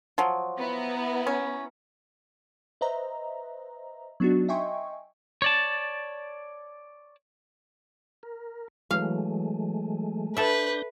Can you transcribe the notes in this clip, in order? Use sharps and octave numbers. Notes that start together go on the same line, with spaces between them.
F3 F#3
B3 E4 A#5
C#4
B4 C5 D#5 E5 A#5
F#3 B3 D4 D#4 F#4
D#5 E5 G5 G#5 C6 C#6
C#5 D5 A5
A#4
E3 F#3 G#3 A3 F5
D4 A4 B4 E5 G6 A#6